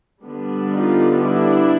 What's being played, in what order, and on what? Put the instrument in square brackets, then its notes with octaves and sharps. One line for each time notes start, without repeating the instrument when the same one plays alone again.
[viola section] D3 G3 B3 D4
D#4 F4
D4 E4